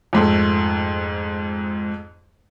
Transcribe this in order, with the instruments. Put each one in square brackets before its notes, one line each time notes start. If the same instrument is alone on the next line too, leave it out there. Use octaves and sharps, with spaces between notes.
[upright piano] F2 G#2 A3